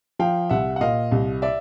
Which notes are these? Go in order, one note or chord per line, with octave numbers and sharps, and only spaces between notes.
F3 F5 G5
C2 E5 F#5
F#5
A#2 D#5 F5
C2
D5 E5